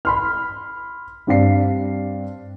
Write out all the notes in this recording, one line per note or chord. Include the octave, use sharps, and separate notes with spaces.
B5 C6 F6
G2 C4 D4 F5 C7